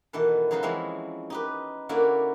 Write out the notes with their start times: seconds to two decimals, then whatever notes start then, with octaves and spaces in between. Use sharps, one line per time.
0.13 B2 D#3 E3 A4 B4
0.51 C#3 F#3 D#4 F4 B4 C5
0.63 E3 F3 G#3 C4 C#4 E4
1.30 D#4 G4 B4
1.89 D3 A#3 C#4 E4 F#4 D5